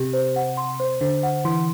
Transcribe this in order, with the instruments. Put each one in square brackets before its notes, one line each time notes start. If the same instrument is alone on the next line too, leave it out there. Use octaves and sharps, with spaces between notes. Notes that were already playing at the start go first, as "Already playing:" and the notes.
Already playing: [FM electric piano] C3 [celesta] G4
[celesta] C5
F#5
C6
C5
[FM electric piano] D3 [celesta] C5
[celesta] F#5
[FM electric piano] E3 [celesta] C6